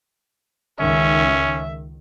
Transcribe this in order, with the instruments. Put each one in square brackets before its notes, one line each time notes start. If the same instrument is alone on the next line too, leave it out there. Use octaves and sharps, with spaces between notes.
[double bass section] C#2 D#3 [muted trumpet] C#4 [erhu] E5